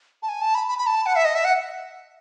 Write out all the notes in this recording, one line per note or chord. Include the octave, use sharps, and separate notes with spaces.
A5
G#5
A5
B5
B5
B5
A5
F#5
E5
D#5
E5
F#5